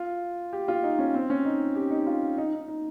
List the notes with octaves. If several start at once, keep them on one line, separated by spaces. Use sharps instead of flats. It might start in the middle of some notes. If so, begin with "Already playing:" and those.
Already playing: F4
G4
F4
D#4
C#4
C4
C#4
D#4
G4
D#4
F4
D#4
D#4
D#4